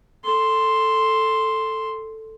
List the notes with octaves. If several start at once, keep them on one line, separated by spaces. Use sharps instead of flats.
A4 C6